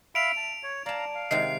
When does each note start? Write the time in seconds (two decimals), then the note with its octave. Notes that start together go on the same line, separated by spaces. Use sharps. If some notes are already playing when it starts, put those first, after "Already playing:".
0.15 E5 F5 B5 D7 F7
0.37 A5
0.63 C#5
0.86 D5 F5 A5 A#5
1.15 F5
1.31 C3 D#3 G#3 C7